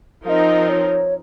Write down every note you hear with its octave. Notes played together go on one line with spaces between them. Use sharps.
F3 C4 D#4 A#4 D#5 F5
C#5